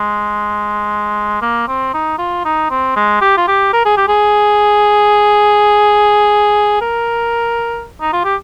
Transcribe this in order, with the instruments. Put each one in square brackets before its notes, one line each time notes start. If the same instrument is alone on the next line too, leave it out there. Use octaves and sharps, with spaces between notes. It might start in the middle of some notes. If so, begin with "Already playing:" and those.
Already playing: [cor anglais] G#3
A#3
C4
D#4
F4
D#4
C4
G#3
G4
F4
G4
A#4
G#4
G4
G#4
A#4
D#4
F4
G4